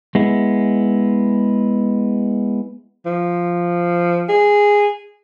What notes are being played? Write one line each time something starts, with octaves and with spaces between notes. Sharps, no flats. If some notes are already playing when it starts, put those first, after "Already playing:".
G#3 B3 E4
F3
G#4